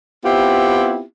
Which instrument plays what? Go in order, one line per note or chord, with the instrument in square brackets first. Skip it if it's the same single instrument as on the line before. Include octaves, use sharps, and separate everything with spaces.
[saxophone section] B3 C4 E4 F4 G4